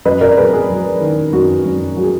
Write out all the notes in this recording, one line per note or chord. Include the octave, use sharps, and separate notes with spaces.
F#2 B4 D#5
A#4 D5
F#3 G#4 B4
G#4
F#3
D#3
F#2 F#4
F#2
F#3 F#4
G#4